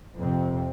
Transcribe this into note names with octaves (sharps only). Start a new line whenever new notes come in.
F2 C3 C4